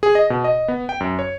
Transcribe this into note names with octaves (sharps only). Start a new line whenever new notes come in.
G#4
D#5
B2
D#5
B3
G5
F#2
C#5